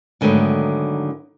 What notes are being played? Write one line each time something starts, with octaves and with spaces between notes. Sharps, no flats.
G#2 D3 D#3 F#3 A3 B3